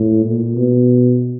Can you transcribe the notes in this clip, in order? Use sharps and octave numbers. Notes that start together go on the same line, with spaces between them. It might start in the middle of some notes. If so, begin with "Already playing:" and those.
Already playing: A2
A#2
B2